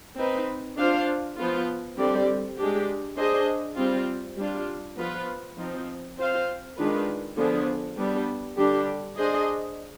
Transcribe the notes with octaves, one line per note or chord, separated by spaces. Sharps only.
C4 D#4 B4
D4 F4 C5 F5
F3 B3 F4
D3 G3 C4 G4 D5
G#3 D4 G4
D4 G#4 C5 D#5
G3 C4 F4
G3 D4 F4
F3 B3 F4 B4
F3 C4 D#4
C4 F4 C5 F5
D#3 G#3 D4 F4 B4
D3 F3 B3 D4 G#4
G3 B3 D4
D3 G3 D4 G4
D4 G#4 C5 D#5